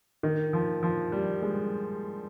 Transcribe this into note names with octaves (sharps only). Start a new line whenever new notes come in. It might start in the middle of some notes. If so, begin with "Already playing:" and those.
D#3
F3
F3
G3
G#3